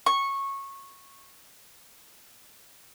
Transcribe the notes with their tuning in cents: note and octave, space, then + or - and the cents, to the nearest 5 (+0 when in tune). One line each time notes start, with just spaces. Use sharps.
C#6 -15